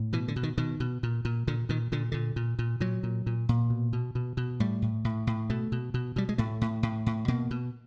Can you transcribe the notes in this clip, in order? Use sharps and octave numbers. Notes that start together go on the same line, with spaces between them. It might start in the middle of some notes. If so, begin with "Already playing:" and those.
Already playing: A2
B2 E3
D3
B2
D#3
B2 D#3
B2
A#2
A#2
A#2 D3
A#2 D#3
A#2 D3
A#2 D3
A#2
A#2
A#2 F#3
A#2
A#2
A#2
B2
B2
B2
B2
A2 G3
A2
A2
A2
B2 A3
B2
B2
B2 G3
G#3
A2 A3
A2
A2
A2
B2 A#3
B2